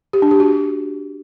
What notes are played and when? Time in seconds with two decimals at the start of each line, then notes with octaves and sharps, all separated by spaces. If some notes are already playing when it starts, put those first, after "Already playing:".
0.13 G4
0.22 D4
0.31 G4
0.40 F#4